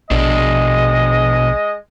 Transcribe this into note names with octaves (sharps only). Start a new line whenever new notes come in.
A#1 B2 G#3 D4 D#5